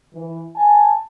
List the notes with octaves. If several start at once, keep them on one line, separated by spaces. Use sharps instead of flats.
E3
G#5 A5